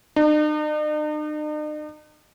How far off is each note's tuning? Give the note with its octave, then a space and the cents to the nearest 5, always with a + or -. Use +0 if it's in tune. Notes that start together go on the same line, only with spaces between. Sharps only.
D#4 -45